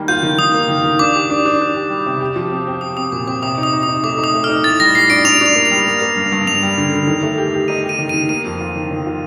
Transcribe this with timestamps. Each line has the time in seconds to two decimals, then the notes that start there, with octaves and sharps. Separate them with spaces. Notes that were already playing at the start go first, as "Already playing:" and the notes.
Already playing: D#3 G3 A#3
0.08 F4 G6
0.23 D#3
0.38 D#3 D#6
0.54 A#3
0.68 D#3
0.83 D#3
0.99 D4 D6
1.14 G4
1.30 D4
1.45 D4
1.61 D4
1.75 G4
1.90 G3
2.06 C3
2.20 G4
2.36 F3
2.51 C4
2.67 C4
2.81 G4 D#6
2.97 C4 D#6
3.12 A#2 D6
3.27 C4 D6
3.43 C3 D#6
3.58 D#4
3.63 D#6
3.73 D#4
3.83 D#6
3.88 D#4
4.03 A3 D6
4.18 D#4
4.24 D#6
4.34 A3
4.44 F6
4.49 D#4
4.64 A2 A6
4.80 G3 A#6
4.95 G3 C7
5.10 D4 D7
5.25 D4 F7
5.41 D4 F7
5.55 A#3
5.65 F7
5.71 G3
5.86 A#3
6.01 A#3
6.17 G2
6.32 G2
6.46 G2 F7
6.62 G3
6.78 D3
6.93 D3
7.07 D#3
7.23 A3
7.38 G4
7.54 G4
7.68 D#4 D#7
7.84 G4
7.89 D#7
7.98 D#3
8.09 D#7
8.14 D#3
8.29 A#3 D#7
8.45 F2
8.60 F4
8.76 D#3
8.91 D#3
9.06 F4